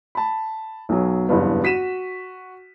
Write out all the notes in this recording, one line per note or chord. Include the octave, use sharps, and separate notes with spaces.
A5 B5
B1 B2 F#3
F#1 E2 G2 B3
F#4 B6 D#7 E7